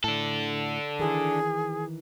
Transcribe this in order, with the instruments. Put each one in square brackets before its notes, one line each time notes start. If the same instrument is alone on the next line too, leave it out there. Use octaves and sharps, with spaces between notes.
[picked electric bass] A2 [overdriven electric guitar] D4 A4
[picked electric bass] D#3 E3 [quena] G#4